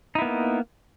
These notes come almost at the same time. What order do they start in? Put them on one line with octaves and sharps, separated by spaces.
D#4 E4 B3 A#3